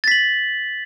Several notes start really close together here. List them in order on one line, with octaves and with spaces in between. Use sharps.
A6 B6 F#7